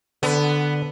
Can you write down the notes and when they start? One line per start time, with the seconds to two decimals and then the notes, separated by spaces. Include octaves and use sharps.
0.23 D3 B3